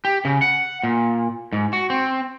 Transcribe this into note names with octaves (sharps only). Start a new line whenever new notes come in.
G4
C#3
F#5
A#2
G#2
F#4
C4